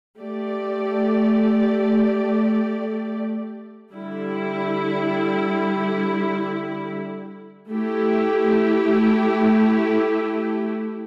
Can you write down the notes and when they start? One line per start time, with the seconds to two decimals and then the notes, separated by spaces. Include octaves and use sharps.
0.19 A3 G4 D5
3.94 D3 G3 E4
7.69 A3 E4 G4